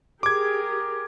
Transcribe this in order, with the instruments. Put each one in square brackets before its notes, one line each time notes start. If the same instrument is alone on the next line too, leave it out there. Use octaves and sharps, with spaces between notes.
[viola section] G4 G#4 A#4 [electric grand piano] D6 G#6